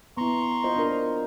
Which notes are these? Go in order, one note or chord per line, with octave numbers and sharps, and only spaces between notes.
B3 E4 A#5 C6 C#6
F4 C5 D#5
D4 A#4